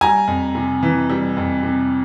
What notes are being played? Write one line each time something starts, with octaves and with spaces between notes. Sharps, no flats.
G3 G#5 A#5
F2
C3
E3
G3
F2
C3